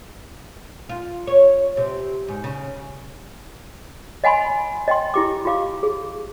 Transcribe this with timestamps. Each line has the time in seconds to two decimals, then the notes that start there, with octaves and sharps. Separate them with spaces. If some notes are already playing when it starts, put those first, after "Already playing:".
0.89 F4
1.27 C#5
1.77 C3
2.28 G#2
2.44 C#3
4.24 D#5 F#5 G#5 B5 C6
4.88 D#5 G5 C6
5.14 E4 G4 D6
5.45 F4 G4 F5 D6
5.83 G#4